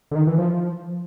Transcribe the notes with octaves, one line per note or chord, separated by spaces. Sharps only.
D3
D#3
E3
F3